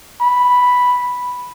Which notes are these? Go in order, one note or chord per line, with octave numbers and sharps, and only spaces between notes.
B5